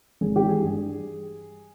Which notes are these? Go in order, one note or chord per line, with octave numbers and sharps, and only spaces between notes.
G#1 G#4
G4
E3
G#4
G2